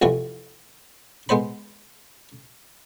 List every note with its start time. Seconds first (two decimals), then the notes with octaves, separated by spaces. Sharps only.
0.02 C2 F2 E3 F3 F#4
1.29 G#3 B3 C5 B5